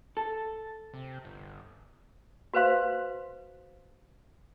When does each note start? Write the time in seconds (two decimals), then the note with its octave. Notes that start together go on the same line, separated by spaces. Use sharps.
0.17 A4
0.93 C3
1.25 G1
2.54 F#4 B4 C5 F5 C6